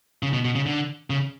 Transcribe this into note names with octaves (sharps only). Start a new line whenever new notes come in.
C#3
B2
B2
C#3
D3
C#3